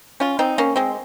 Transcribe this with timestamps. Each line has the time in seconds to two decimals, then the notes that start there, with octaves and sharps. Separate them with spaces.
0.20 C#4 F4
0.39 C4 D#4
0.58 A#3 C#4
0.76 G#3 C4